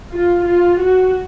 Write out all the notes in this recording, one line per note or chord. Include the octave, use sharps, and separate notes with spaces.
F4
F4
F#4